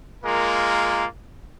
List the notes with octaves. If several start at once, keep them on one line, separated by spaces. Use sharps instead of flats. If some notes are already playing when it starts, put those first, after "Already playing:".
G#3 A#3 F4 A#4